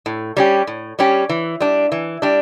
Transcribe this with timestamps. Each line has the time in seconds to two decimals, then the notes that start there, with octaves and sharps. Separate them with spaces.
0.06 A2
0.37 G3 C#4 G4
0.67 A2
0.99 G3 C#4 G4
1.29 E3
1.60 G3 D4
1.92 E3
2.22 G3 D4